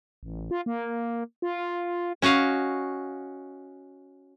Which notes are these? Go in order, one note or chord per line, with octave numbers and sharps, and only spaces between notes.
A1
F4
A#3
F4
C#4 F#4 D#5 F5